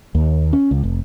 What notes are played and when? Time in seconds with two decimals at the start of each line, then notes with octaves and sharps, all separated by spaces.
0.15 D#2
0.53 C#4
0.71 C#2
0.83 F1